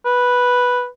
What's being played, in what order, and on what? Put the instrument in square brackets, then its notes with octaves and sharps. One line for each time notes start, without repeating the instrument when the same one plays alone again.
[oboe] B4